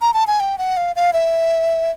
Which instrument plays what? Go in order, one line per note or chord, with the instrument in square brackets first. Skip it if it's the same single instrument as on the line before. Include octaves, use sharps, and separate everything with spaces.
[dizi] A#5
A5
G#5
G5
F#5
F5
F5
E5